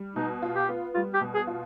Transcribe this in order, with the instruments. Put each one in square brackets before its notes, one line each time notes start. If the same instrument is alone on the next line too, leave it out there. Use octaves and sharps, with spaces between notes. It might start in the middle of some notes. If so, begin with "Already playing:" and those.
Already playing: [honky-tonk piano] G3
[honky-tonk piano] B2 [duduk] D#4
[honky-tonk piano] F4
[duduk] G4
[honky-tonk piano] B3
[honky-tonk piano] G3 [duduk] F4
[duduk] G4
[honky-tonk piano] B2
[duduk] G#4
[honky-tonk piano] F4